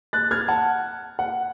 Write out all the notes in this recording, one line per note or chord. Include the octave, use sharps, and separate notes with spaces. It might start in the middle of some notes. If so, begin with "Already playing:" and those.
F#6 A6
F6 G#6
F#5 A5
F#5